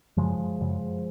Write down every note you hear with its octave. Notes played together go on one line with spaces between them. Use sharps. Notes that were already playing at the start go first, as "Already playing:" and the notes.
F#2 C#3 F3 G#3
F#2 C#3